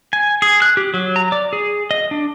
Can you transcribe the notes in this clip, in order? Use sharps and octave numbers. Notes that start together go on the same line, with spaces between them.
G#5
G#4
F#6
G4
F#3
A#5
D5
G#4
D#5
D4